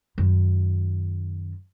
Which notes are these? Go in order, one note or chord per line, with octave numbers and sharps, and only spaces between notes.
F#2 D#3